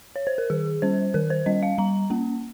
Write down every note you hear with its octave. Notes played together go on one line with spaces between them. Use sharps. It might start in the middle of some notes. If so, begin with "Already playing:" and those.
C#5
C5
A#4
D#3 G#4
G3 C#4 C5
D#3 A#4
C5
G3 C#4 D#5
F5
G3 A#5
A#3 C#4